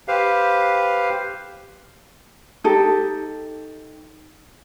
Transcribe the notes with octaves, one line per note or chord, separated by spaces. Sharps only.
G4 B4 C5 F5
D#4 G4 A4